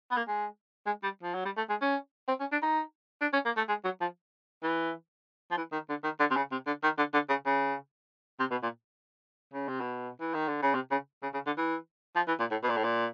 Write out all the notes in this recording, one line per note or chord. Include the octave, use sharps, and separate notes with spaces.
B3
A#3
G#3
G#3
G3
F3
F#3
G3
A3
G#3
C#4
C4
C#4
D4
D#4
D4
C#4
A#3
A3
G#3
F#3
F3
E3
F3
E3
D#3
D3
D#3
D3
C3
C#3
C3
D3
D#3
D3
D3
C#3
C#3
C3
B2
A#2
C#3
C3
B2
E3
D#3
D3
C#3
C3
C#3
C#3
C#3
D3
E3
F3
E3
A#2
A2
B2
A#2
A2
A#2